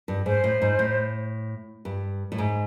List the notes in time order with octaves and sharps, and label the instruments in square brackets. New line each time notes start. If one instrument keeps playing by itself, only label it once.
[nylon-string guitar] G2
[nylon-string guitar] G#2 [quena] C5
[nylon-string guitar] A2
G#2
A2
G2
A2
G#2